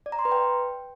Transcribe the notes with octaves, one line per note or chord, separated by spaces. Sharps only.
D5
A#5
C6
B4
G5